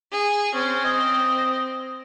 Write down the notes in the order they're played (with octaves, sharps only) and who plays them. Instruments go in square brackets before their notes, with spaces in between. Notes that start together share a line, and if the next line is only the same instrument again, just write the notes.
[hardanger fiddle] G#4
[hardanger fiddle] C4 [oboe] C#4
[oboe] D#5